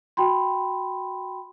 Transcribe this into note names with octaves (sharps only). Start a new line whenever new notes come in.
F#4 G5 B5 C6